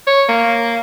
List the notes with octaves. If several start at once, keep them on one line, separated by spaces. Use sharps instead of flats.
C#5
A#3